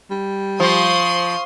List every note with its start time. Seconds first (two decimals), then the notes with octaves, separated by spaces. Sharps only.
0.11 G3
0.60 F3 C6 C#6 D#6